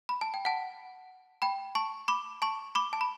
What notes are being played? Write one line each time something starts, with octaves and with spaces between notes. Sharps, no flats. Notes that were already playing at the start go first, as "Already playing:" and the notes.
B5
A5
G5
F#5 A5
G5 B5
A5 C#6
B5 D6
A5 C#6
B5 D6
A5
B5